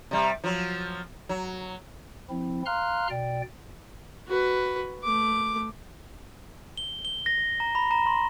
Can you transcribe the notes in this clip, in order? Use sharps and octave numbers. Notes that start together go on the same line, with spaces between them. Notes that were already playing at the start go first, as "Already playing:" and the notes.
C3 G3
F3 F#3
F#3
F3 C4 E4
F5 A#5 C6 F6 F#6
B2 D5 G5
F#4 B4
A3 D6
G7
G7
A#6
A#5
B5
A#5
C6